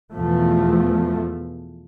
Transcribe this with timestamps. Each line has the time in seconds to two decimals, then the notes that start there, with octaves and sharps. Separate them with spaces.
0.13 E2 B2 F3 A3